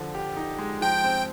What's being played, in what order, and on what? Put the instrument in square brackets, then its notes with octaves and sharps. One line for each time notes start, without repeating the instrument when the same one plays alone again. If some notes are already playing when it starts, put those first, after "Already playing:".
Already playing: [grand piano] D3 F3
G4
D#4
G#3
[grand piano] F3 [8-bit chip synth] G5
[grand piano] C4